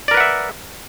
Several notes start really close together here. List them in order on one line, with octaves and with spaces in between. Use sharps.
D5 A#4 B4 F#5 E5